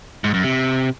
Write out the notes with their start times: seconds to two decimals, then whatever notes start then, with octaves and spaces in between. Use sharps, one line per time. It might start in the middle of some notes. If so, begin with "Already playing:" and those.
0.24 G#2
0.34 F#2
0.44 C3